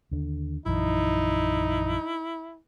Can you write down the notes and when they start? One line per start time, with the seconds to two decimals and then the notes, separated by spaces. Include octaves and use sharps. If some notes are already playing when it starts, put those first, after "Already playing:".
0.11 D#2 D3
0.66 A#1 F#2 E3 D#4 E4